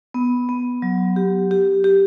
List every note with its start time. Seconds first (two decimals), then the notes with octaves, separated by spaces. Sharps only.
0.14 B3
0.49 B3
0.82 F#3
1.16 G4
1.51 G4
1.84 G4